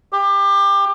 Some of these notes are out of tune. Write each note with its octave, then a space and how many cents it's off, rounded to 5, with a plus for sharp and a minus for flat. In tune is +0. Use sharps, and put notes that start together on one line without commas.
G4 +25